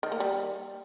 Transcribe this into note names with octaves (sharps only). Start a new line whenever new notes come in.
D#3
A#3
G3